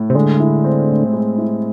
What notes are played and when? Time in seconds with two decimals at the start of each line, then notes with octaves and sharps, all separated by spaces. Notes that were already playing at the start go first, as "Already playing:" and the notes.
Already playing: A2
0.10 C3
0.15 D3 G#3
0.39 E4
0.64 C4
0.88 A2
1.13 G#3
1.38 E4